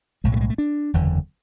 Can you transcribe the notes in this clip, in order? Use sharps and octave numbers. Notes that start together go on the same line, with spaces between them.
B1 A2 G#3
F#3
A3
G#3
A3
D4
F#1 E2 D3